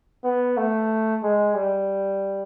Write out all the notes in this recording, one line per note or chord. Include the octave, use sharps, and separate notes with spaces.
B3
A3
G#3
G3